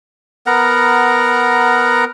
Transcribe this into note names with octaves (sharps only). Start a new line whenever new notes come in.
B3 A#4 F#5 A#5